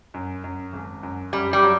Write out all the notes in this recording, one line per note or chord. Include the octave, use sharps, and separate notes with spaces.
F#2
F#2
G#1
F#2
F#2 G3
G3
F#3